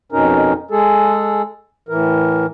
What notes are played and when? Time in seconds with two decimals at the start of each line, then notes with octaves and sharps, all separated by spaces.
0.12 F2 B2 C#4 D#4 A#4
0.71 G#3 G#4 A4
1.89 A2 E3 A#4